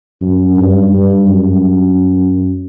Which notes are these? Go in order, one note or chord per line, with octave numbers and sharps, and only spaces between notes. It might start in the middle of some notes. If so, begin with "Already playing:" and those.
F#2
G2
G2
F#2